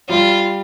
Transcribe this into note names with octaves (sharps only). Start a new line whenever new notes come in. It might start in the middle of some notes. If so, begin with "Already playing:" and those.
G3 F4